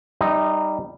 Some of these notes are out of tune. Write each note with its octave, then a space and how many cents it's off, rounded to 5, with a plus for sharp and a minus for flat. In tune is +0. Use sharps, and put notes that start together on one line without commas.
G3 +0 D#4 -10 E5 -40